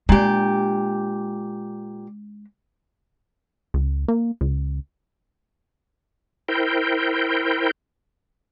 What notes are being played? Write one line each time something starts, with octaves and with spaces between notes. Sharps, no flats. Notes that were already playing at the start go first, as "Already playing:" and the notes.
A#2 G#3 D4 G4
C#2
A#3
C#2
E4 A#4 C5 G5